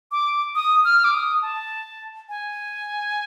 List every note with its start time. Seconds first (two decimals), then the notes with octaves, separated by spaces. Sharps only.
0.12 D6
0.55 D#6
0.84 F6
1.04 D6
1.14 D#6
1.42 A5
2.29 G#5